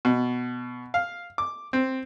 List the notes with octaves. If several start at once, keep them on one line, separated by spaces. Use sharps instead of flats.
B2
F5
D6
C4